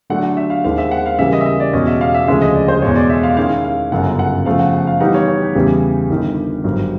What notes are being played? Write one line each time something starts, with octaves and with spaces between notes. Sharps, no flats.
D3 F#3 A3 D4 F#5
F#5
E5
F5
D#2 D#3 G#3 C4 F5
E5
F#5
F5
C#3 E3 G3 A#3 E5
D#5
E5
D#5
D5
E2 B2 G#3 C#4 F#4 D#5
E5
F5
E5
D2 C#3 F3 G#3 E5
D#5
D5
C5
E2 B2 G#3 C#5
D5
E5
F5
D#3 G#3 C#4 E4 F5
F5
G1 F#2 C#3 F#5
F#5
C#3 F3 A3 F5
F#5
F#5
F5
E3 G3 B3 D#4 F#5
C#5
C#5
G4
E2 C#3 E3 G3
G1 G2 D#3
G#1 G2 D3 F#3